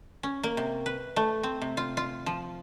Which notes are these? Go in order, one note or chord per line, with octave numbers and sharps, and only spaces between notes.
C#4
A#3
C3
B4
A3
C4
C3
F4
F4
F3